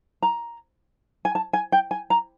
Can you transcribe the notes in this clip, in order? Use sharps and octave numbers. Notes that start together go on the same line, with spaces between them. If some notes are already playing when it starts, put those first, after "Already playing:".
A#5
G#5
A5
G#5
G5
G#5
A#5